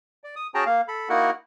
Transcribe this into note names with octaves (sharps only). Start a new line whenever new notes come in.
D5
D#6
C#4 F#4 G#4 G5 A5 A#5
A#3 F5
A4 B5
A#3 D#4 E4 F#4 A#4 F#5